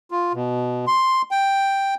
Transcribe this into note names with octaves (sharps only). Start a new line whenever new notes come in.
F4
B2
C6
G5